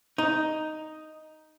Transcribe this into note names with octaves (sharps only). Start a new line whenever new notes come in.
D#4